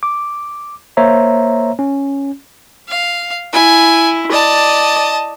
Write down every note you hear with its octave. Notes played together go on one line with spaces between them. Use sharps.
D6
A#3 C5 C#5 E5 A#5
C#4
F5
E4 G#5
D5 D#5 A5